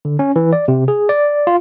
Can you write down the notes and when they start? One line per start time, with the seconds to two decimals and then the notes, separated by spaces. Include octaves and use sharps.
0.05 D3
0.19 C#4
0.36 E3
0.53 D5
0.68 C3
0.88 G#4
1.09 D5
1.47 F4